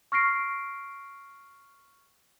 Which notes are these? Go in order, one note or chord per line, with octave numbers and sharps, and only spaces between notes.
C#6 F6 A#6 C7 D7